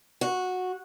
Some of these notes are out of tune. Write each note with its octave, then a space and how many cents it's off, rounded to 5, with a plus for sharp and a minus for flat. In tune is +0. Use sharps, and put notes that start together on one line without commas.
F#4 -10